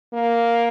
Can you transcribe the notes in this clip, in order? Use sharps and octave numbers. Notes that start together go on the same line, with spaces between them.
A#3